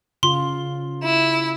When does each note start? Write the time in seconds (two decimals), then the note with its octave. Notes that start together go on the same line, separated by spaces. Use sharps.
0.23 C#3 F4 C6
1.03 E4 E7